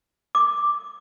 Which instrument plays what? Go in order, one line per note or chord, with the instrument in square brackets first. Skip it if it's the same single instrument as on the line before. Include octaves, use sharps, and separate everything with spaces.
[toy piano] D6